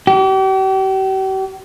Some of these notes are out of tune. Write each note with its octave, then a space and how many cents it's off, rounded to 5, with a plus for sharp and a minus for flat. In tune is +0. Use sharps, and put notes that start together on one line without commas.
G4 -40